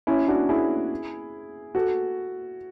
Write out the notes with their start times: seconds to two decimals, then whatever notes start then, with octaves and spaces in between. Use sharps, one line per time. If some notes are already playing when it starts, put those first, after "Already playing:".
0.07 C#4 E4
0.28 D4 F#4
0.49 E4 G#4
1.75 F#4 A4